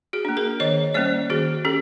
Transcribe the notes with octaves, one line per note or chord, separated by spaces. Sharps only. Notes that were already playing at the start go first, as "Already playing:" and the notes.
F#4 G#4
A#3 D4
G#4 A#4
D#3 C#5 D#5
G3 A#3 C#4 C5 D5
D#3 F#4 G#4
C#4 G4 A4